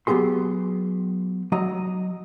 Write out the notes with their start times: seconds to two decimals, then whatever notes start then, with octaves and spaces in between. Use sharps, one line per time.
0.07 F#3 B3 G4 G#4 C6
1.52 F#3 D#5 A#5